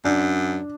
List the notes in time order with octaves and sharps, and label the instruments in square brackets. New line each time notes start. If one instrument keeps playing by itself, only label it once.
[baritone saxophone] F#2 [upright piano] D4